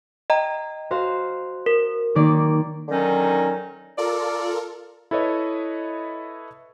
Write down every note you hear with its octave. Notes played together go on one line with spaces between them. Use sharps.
D#5 G5 A#5
F#4 C5 F5
A#4
D#3 A#3 D5
D3 D#3 F#3 C#4 D#4
F4 A4 A#4 D5
E4 A4 B4 C#5 D#5